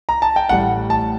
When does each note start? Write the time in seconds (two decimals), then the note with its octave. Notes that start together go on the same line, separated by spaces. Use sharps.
0.09 A#5
0.22 A5
0.36 G5
0.49 A1 A2 G3 F#5
0.90 A5